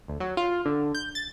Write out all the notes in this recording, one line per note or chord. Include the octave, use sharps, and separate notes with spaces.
D2
F#3
F4
D3
G6
A6